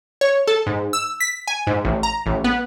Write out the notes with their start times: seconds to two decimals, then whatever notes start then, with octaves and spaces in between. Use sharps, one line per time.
0.21 C#5
0.48 A4
0.67 G#2
0.93 E6
1.20 B6
1.47 G#5
1.67 G#2
1.85 A1
2.03 A#5
2.26 A1
2.44 B3